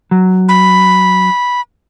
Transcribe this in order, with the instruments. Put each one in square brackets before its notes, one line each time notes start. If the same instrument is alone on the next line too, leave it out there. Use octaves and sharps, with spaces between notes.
[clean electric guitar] F#3
[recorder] B5